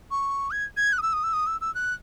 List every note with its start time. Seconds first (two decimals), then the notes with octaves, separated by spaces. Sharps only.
0.11 C#6
0.51 G#6
0.77 G#6
0.93 F#6
0.98 D#6
1.02 E6
1.13 D#6
1.23 E6
1.33 D#6
1.47 E6
1.61 E6
1.75 F#6